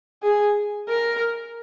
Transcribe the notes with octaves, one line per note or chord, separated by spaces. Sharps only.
G#4
A#4